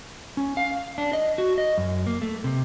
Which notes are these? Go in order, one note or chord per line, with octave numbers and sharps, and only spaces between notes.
C#4
F5
D4
D#5
F#4
D#5
F#2
A#3
A3
C3